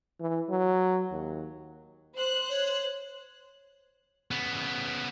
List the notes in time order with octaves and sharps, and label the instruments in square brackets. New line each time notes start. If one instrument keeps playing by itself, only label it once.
[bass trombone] E3
F#3
D#2
[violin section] C5 F#6
[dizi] C#5
[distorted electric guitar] C#3 B3